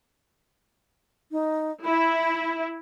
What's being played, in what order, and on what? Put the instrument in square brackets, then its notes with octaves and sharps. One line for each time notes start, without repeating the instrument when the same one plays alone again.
[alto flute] D#4
[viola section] E4 [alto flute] B5